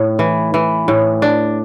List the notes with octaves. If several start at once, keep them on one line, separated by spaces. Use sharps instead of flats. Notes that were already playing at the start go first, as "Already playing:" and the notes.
Already playing: A2
E3
E3
A2
D4